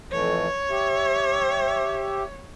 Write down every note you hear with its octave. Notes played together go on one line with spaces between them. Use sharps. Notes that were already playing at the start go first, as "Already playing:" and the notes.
F2 E3 A3 C#5
G4 E5